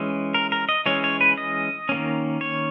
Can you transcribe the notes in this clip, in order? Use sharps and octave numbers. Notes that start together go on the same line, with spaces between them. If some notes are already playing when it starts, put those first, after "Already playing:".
Already playing: E3 G#3 C#4
A#4
A#4
D#5
E3 G#3 C#4 C#5
C#5
B4
D#5
D#3 A#3 C#4
C#5